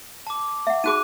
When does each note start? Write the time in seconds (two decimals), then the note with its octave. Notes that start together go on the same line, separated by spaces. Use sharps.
0.27 A5 D6
0.67 E5 F#5
0.84 D#4 F#4 G#4 D6 F#6 D#7